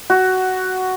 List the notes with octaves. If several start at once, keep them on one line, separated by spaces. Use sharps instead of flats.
F#4